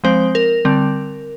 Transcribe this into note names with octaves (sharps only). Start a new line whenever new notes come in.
F3 G#3 C4 C5
A#4
D3 G3 C4